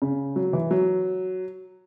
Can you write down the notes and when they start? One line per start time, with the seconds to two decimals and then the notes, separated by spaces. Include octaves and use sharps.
0.02 C#3
0.36 F#3
0.53 E3
0.71 F#3